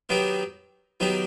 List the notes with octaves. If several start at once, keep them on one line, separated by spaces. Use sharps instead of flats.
D#3 F#3 B3 D#4 G4
D#3 F#3 B3 D#4 G4